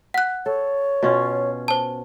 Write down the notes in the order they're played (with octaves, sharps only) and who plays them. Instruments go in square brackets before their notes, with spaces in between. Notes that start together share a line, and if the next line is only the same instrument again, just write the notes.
[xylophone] F#5 F#6
[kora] A4 [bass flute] C#5
[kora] B2 C#4 F4
[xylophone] C5 A5